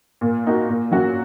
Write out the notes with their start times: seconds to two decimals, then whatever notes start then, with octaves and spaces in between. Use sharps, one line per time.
0.21 A#2
0.44 A#3 D#4 F#4
0.68 A#2
0.91 F#3 C#4 F#4